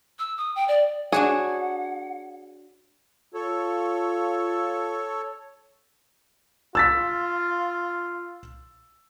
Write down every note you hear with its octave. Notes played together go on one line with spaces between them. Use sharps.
E6
D#6
G5
D5
D4 F#4 G#4 C#5 F#5
F4 A4 C#5
F4 E6 A6 B6